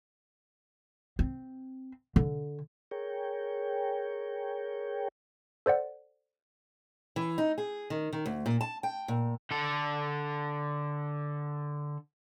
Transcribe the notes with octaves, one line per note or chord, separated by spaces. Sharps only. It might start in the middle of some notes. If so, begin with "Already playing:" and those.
C4
D3
G#4 A#4 C#5 G5
A4 C5 D5 F#5
E3
D#4
G#4
D#3
D#3
D2
A#2
A5
G5
A#2
D3 A4